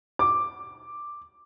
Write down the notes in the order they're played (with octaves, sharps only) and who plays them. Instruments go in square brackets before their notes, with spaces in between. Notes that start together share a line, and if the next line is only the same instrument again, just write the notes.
[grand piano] D6